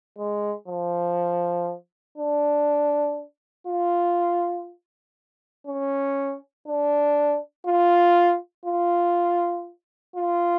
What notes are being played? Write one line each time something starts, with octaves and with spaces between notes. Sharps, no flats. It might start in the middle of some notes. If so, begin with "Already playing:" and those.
G#3
F3
D4
F4
C#4
D4
F4
F4
F4